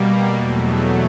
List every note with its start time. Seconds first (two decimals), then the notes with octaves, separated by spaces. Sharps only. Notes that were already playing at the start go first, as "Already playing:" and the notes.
Already playing: B2 G3 A#3
0.35 E2 B2 F#3 A3